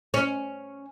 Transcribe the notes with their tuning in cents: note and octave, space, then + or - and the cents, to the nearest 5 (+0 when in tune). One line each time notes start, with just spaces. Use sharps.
C#4 +0